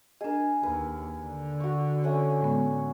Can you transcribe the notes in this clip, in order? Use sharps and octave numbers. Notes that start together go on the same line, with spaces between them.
D4 G#4 A#4 D#5
D#2 B4
D3
F#4 C#6
A3 C#4 D#6
A2 G#3 B3